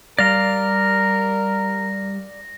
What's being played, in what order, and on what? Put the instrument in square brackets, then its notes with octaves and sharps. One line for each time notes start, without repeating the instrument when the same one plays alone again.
[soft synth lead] G3 [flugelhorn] A#4 [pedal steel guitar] D5 F5 A#5 [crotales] A#6